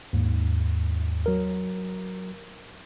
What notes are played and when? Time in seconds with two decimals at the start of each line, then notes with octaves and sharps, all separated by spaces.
0.13 D#2 G#2
1.26 F#3 A#4